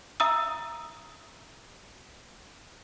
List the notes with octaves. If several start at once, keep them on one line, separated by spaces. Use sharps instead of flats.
E5 A#5 D#6 E6